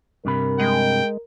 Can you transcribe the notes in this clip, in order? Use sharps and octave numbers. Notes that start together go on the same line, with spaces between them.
G2 C3 A#4 B5
G#3 G5